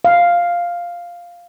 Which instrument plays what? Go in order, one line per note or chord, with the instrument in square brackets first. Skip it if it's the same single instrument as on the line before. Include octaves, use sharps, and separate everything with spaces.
[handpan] F5